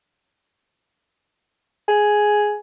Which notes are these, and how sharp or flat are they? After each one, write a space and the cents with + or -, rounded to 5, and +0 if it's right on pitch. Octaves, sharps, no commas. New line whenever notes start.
G#4 +5